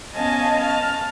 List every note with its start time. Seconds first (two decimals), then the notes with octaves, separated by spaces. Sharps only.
0.14 B3 C#4 D#5 F5 G#5 A5
0.61 A5 F6